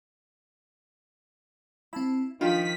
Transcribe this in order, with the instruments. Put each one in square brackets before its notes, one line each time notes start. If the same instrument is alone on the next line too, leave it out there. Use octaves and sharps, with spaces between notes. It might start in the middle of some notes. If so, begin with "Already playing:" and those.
[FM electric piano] C4 A5 B5 [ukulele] E4
[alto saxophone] D#3 [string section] F3 B6 [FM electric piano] D4 [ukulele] F4 A#4 G5